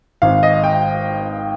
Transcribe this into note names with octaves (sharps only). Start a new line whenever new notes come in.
G#1 F5
D#5
G5